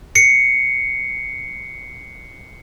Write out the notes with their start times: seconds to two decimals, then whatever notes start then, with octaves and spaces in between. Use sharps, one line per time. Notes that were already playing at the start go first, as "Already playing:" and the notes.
0.15 C7 C#7